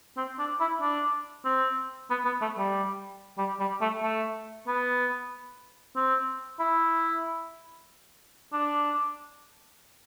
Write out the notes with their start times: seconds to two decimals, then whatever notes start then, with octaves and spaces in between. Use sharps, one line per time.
0.17 C4
0.39 D4
0.60 E4
0.81 D4
1.45 C4
2.10 B3
2.25 B3
2.41 A3
2.58 G3
3.38 G3
3.60 G3
3.81 A3
4.03 A3
4.67 B3
5.96 C4
6.60 E4
8.53 D4